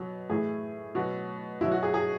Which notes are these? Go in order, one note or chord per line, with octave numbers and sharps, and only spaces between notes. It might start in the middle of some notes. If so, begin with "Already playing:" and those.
Already playing: B2 F#3
A2 E3 G#4
B2 F#3 F#4
B2 F#3 E4
F#4
G#4
G#4